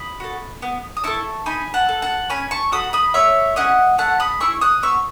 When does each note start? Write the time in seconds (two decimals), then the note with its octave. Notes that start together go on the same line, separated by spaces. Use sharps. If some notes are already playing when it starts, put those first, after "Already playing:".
Already playing: B5 D#6
0.20 F#4 A4
0.62 B3
0.97 D#6
1.04 E4 A4 A5 C#6
1.46 D#4 G#5 B5
1.74 F#5 A5
1.89 A4
2.02 F#5 A5
2.30 C#4 G#5 B5
2.51 A5 C#6
2.72 F#4 A4 B5 D#6
2.93 B5 D#6
3.14 A3 C#5 E5
3.56 C#4 E4 G#4 D#5 F#5
3.98 A3 F#5 A5
4.20 B5 D#6
4.40 E4 G#4 C#6 E6
4.61 D#6 F#6
4.83 B3 C#6 E6